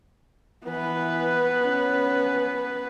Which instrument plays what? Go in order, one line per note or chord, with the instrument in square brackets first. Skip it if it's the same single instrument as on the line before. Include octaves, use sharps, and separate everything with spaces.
[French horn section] E3 [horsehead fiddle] B3 B4
[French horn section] C#4